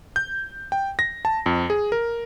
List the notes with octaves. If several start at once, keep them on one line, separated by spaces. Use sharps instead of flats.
G6
G5
A#6
A5
F2
G#4
A#4